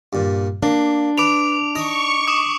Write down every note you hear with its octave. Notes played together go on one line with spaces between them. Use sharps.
G2 A#2
A#3 D4
B4 D6 D7 F7
D#4 D#5 C#6
D6 D#6 E7